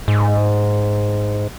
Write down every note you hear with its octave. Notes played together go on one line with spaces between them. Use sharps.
G#2